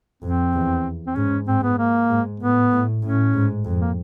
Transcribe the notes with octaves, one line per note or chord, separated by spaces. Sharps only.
F2 C4
E2
C4
G#2 C#4
G#2 C4
B3
A#3
G#2
A2 B3
A2
A2 C#4
G#2
F2
A#3